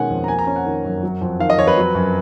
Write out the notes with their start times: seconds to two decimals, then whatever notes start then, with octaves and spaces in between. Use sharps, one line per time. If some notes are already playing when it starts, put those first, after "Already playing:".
Already playing: B2 D#3 G#3 C#4 F#5 G#5
0.10 F2
0.24 A#5
0.28 A#3 G#5
0.39 A#5
0.47 C#4
0.56 F#5
0.66 D#3
0.85 F#2
1.03 F#3
1.21 F2
1.39 D#3 F5
1.50 D#5
1.58 F2 C#5
1.67 B4
1.77 F#3
1.95 F#2